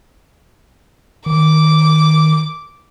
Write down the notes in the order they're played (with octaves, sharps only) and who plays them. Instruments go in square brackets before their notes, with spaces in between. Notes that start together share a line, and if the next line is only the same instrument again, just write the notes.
[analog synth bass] D#3 [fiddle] D6